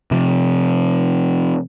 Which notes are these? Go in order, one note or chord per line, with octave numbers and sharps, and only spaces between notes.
C3 F3